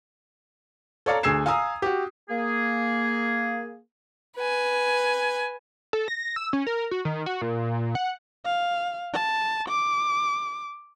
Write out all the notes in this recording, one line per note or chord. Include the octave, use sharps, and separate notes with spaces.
A4 C#5 D5 F5 A#5
D2 G#4 E6 G#6 C7 E7
F5 G#5 A#5 D#6 E6
F#4 G4
A#3 G#4
B4 G#5
A4
A#6
E6
C#4
A#4
F#4
D#3
F#4
A#2
F#5
F5
A5
D6